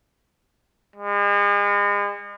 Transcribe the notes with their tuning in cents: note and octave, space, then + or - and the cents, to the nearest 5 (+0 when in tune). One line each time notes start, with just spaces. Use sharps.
G#3 -40